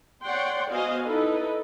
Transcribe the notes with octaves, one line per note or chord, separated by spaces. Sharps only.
C#5 D5 F#5 G5 C6
B3 F#4 C5 D#5 F5 G#5
D#4 E4 A4 B4